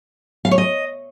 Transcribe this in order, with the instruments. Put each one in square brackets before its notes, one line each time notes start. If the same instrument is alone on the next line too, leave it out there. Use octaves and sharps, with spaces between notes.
[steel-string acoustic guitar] F5
C#5
D#5